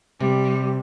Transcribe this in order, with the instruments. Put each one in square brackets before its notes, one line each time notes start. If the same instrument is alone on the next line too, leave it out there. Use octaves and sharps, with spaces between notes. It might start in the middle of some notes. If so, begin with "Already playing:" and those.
[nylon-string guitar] C3 [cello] G3